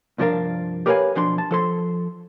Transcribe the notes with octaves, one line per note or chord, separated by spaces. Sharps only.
C2 G2 F3 D4 A#4 F5
G4 A#4 B4 C#5 F5 G#5
B1 F3 D4 C6
A5
F3 A4 C6